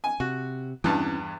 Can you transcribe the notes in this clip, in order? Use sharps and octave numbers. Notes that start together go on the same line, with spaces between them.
G#5
C3 F#4
E2 G2 E3 C4 C#4 A5